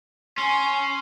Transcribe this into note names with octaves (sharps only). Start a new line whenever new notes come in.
C#4 G#5 C6